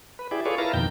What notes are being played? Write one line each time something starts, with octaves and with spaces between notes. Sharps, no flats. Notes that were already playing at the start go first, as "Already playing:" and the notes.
B4
E4 G4 G#4 D5
F4 G#4 A4 B4 C#5 D5
E4 A#4 B4 F5 A5 A#5
F2 B2 D#3 G5 G6